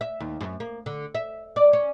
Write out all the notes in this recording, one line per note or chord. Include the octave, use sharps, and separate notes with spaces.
E5
D#2
F#2
A#3
D3
E5
D5
C#4